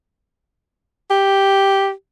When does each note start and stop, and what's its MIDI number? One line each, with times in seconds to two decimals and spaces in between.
1.10 1.91 67